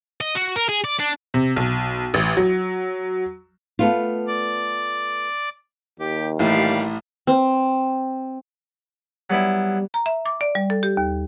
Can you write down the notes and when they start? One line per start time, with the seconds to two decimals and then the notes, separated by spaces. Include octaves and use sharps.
0.21 D#5
0.35 F#4
0.56 A#4
0.69 G#4
0.84 D5
0.99 D4
1.34 C3
1.56 B1
2.14 A1
2.37 F#3
3.79 A3 B3 F4
4.27 D5
6.00 D#2 G4
6.39 A1 A2 G3 F5
7.27 C4
9.30 F#3 G3 B3 E4
9.94 A#5
10.06 E5
10.25 D6
10.41 D5
10.55 G3
10.70 A4
10.83 G4
10.97 D#2